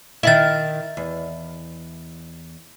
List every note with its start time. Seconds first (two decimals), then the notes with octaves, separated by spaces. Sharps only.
0.23 D#3 E4 D#5 E5 A6
0.97 E2